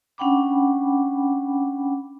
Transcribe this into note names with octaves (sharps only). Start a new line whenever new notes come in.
C#4 D4 F#5 G5 B5 D6